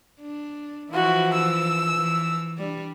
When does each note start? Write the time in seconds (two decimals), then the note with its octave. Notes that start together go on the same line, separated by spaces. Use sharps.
0.20 D4
0.92 E3 F3 E4 F#4
1.34 E6
1.96 E3
2.58 G3 D4